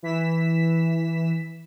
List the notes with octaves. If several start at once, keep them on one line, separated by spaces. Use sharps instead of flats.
E3 B6 E7